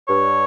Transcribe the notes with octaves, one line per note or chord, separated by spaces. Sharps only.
G2 C#5